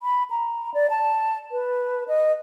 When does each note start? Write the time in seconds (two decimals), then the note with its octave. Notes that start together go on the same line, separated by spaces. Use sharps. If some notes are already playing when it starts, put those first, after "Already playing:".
0.03 B5
0.31 A#5
0.74 D5
0.90 A5
1.52 B4
2.08 D#5